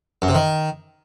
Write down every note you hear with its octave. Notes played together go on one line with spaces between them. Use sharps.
F#2
C3
D#3